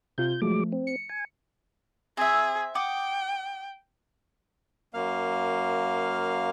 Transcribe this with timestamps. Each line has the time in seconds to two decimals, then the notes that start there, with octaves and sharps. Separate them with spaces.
0.18 C3 F4 G6
0.42 F3 F#3 G#3 A3 D6
0.72 C4
0.87 C#7
1.09 G#5
2.17 C4 G#4 E5
2.75 F#5 G5 D6 D#6
4.94 F#2 A#3 F5